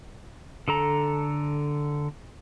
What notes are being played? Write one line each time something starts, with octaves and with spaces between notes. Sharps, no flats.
D3 A4 A#5